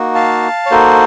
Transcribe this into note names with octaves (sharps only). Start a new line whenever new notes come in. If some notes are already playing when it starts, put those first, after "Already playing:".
Already playing: A#3 D#4 F#4
F5 A5
C#5
A#3 D#4 F#4 A4 C5